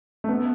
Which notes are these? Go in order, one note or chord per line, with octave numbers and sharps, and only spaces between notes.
A3
B3